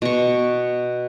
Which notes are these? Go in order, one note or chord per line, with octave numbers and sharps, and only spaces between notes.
B2 C#6